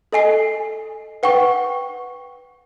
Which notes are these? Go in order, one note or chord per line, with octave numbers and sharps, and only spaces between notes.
A4 D#5 G#5 C7
B4 F#5 G5 C#6